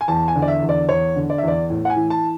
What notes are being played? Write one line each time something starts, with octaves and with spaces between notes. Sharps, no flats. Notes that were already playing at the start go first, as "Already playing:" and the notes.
G#5
E2 A5
G#5
D3
D5
E5
E2
D5
E2 C#5
D3
D5
E5
E2 D5
A2
F#5
G#5
E3
A5